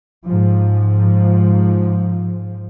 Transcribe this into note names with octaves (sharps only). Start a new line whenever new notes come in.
G#2 F3